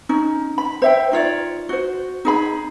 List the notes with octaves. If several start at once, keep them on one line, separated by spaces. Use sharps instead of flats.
C#4 D#4
B5
C5 E5 G5
D#4 F4 C#5 D5
F#4 C5
D#4 G#4 B5